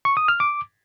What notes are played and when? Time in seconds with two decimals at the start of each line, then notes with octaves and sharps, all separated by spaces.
0.05 C#6
0.17 D#6
0.28 F6
0.40 D6